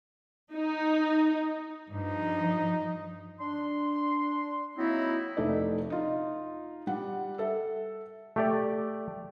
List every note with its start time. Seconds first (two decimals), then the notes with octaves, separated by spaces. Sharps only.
0.53 D#4
1.90 G2 F3 D#4
3.40 D4 C6
4.78 F#3 A#3 C4 D#4 E4
5.37 F1 A3 D#4 D5
5.90 D#4 F4
6.87 G3 F#5
7.38 A4 E5
8.36 A3 G4 D5